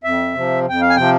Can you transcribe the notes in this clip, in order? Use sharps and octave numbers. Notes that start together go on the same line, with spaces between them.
F2 E5
C3 F3
F2 G5
F5
G#5
C3 F3 G5